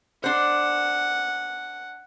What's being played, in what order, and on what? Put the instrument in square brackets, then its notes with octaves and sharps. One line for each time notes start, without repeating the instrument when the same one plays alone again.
[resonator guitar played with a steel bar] D4 C5 [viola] F#5